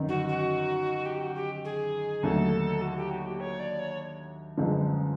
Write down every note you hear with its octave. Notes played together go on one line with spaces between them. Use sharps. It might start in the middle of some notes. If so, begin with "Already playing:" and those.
Already playing: G1 F#2 D#3
F#4
F#4
G4
F#4
G4
G#4
D#2 D3 F#3 A3 A4
F#4
G4
F#4
G4
C#5
D5
C#5
G1 F#2 D3 F3 G#3